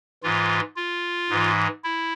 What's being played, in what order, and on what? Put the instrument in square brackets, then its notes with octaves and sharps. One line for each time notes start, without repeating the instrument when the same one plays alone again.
[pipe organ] G#2 E3 F4
F4
G#2 E3
E4